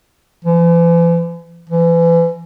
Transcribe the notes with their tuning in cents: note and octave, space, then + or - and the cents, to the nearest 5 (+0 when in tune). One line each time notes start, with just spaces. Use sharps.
E3 +45
E3 +30